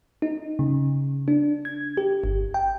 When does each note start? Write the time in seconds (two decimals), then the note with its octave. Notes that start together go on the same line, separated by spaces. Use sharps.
0.22 D#4
0.59 C#3
1.28 D4
1.65 G#6
1.97 G4
2.24 G1
2.54 G5